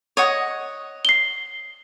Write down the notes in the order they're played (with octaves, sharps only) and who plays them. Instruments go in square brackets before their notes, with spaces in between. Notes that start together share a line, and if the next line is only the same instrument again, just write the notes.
[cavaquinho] C#5 D#5 F#5
[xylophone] C7 G7